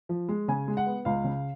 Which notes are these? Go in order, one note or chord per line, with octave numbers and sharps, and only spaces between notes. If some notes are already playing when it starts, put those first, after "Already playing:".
F3
G#3
C#3 G#5
G#3
F#5
B3
C#2 F5
C#3